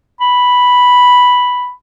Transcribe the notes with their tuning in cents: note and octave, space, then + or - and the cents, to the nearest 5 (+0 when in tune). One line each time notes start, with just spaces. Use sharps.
B5 +0